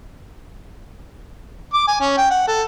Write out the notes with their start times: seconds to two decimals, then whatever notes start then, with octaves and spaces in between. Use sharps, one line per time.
1.73 D6
1.88 G#5
2.01 C#4
2.17 G5
2.31 F#5
2.47 A4